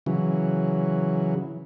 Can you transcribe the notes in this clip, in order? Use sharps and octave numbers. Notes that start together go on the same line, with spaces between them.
C#3 E3 F#3